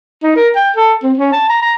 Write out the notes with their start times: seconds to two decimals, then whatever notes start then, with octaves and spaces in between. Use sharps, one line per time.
0.23 D#4
0.36 A#4
0.56 G5
0.76 A4
1.03 C4
1.18 C#4
1.32 A5
1.50 A#5
1.62 A#5